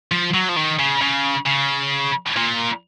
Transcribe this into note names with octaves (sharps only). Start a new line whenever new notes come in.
F3
F#3
F3
D#3
C#3
C#3
C#3
A#2